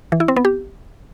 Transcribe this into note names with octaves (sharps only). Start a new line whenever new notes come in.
E3
E4
C4
B3
G4